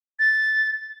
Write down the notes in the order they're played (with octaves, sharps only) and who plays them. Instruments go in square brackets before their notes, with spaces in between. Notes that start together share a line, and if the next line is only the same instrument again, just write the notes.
[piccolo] A6